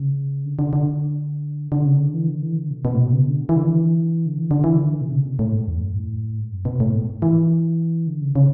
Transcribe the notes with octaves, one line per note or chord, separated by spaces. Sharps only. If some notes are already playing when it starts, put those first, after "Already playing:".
Already playing: C#3
D3
D3
D3
D3
C#3
D3
E3
D3
E3
D3
B2
B2
A2
B2
C#3
D3
E3
D3
E3
D3
E3
D3
E3
D3
B2
C#3
B2
A2
G#2
E2
F#2
A2
G#2
F#2
B2
A2
G#2
E3
D3
C#3
C#3